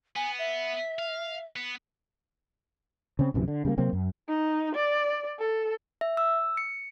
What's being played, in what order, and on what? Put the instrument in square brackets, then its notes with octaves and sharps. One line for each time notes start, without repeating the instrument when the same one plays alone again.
[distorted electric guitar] B3 [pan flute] G#5
[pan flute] E5
[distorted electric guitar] F5
B3
[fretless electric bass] C#3 C4
A#1 F#2 C3 E3
D3
C#3 G3 A3 A#3
C3 F#3 A#3 C4
F#2
[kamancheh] D#4
D5
A4
[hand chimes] E5
E6
C#7